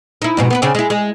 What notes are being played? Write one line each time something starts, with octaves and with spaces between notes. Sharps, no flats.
D#4 E4
F2 G#2 B2
B3 D#4 B4
C#3 C4 D4
G#3 E4
G#3